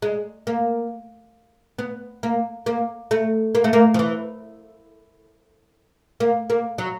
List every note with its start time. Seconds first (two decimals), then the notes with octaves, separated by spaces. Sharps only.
0.02 G#3
0.47 A#3
1.78 B3
2.23 A#3
2.66 A#3
3.11 A3
3.55 A#3
3.64 A3
3.73 A#3
3.94 F3
3.99 E3
6.20 A#3
6.50 A#3
6.78 F#3